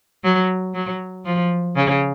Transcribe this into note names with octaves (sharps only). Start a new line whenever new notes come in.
F#3
F#3
F3
C#3